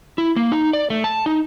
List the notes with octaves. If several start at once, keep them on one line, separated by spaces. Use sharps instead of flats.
E4
A#3
D#4
D5
A3
A5
D#4